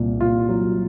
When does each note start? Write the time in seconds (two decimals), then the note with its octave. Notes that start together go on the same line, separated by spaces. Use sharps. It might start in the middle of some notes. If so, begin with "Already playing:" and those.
Already playing: C2 A#2 C4
0.20 A#2 F4
0.49 F#3